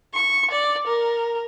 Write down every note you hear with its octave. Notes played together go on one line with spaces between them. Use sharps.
C#6
D5
A#4